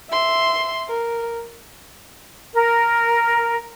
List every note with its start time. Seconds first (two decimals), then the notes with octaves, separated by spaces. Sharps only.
0.10 E5 C6
0.88 A#4
2.54 A#4